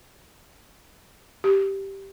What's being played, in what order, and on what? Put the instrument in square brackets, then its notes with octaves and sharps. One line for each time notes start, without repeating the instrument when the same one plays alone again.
[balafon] G4